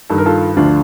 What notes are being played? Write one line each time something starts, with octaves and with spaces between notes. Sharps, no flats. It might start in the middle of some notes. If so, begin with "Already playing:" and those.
G2 D#3 A4
A#4
F4 A4
D2 D3 F3 D4 F4